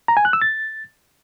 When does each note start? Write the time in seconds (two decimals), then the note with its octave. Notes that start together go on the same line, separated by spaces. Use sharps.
0.08 A#5
0.17 G#5
0.25 F#6
0.33 E6
0.42 A6